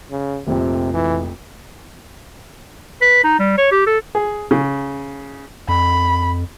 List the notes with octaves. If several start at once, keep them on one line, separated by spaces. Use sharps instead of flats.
C#3
F1 A#1 F2 C3
E3
B4
D#4
G3
C#5
G4
A4
G#4
C#3
F2 B5